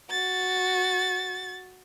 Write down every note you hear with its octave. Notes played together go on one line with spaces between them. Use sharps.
F#4 A6